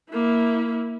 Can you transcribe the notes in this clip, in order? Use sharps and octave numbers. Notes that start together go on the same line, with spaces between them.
A#3 E4